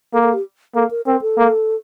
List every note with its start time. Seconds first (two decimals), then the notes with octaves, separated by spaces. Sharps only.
0.13 A#3 A4
0.23 A4
0.34 G4
0.75 A#3 A4
0.91 A#4
1.06 C4 A#4
1.22 A4
1.37 A#3